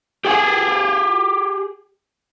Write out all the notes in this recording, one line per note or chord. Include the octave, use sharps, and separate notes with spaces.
G4 G#4 F#5 G#5